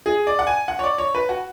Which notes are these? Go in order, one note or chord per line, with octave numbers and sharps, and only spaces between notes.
G#4
D5
F#5
G#5
F#5
C#5
D5
C#5
B4
F#4